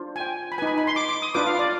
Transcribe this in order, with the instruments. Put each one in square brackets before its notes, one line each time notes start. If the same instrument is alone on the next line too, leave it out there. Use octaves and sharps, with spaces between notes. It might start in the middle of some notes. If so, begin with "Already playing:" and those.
Already playing: [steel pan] D4 F4 C5
G#5
G5
B5
D#4 B4 G#5
B5
B5
C6
D6
D6
D#6
D4 F4 B4 D6
F5
D5